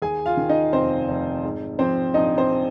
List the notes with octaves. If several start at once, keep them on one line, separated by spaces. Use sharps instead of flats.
D#2 G#4 G#5
F4 F5
D#3
D#4 D#5
F1 C4 C5
F1
G#2
F3 C4 C5
A#1 D#4 D#5
C4 C5